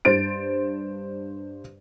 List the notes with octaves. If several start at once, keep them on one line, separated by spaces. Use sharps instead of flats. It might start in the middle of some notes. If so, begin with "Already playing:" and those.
G2 C5 A6 D7